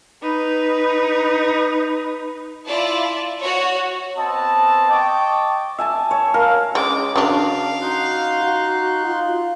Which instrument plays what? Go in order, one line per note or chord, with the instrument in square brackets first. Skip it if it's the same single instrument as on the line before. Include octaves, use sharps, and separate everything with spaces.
[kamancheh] D#4 B4
[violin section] E4 F4 D5 A5
F#4 C#5
[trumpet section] B3 C4 D#5 A5
D#5 G5 A5 C#6 D6
[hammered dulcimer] E5 G#5 A5
C#5
A#4 F5
[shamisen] G#3 [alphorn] C#4 [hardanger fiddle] D6
[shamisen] C#3 D4 [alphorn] F#4 [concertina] A#4 [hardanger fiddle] F5
[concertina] D#4 C6 F#6 [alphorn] F#4
[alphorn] F#4
F4